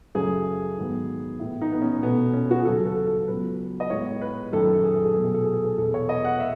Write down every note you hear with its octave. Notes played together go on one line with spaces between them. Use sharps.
F#2 C#3 F#3 A3 G#4
G#2 D#3 F#3 B3
A2 E3 B3 E4
D#4
B3
C#4
B2 A3 B3
C#4
F#4
G#4
D#2 C#3 F#3 A4
A4
A4
C#2 C#3 F#3 B3 B4
D#5
A2 G#3 B3 C#5
B4
F#2 D#3 A3 A4
G#4
A4
G#4
B2 F#3 A3 A4
G#4
A4
G#4
A4
G#4
E2 B2 A3 A4
C#5
D#5
F#5
E5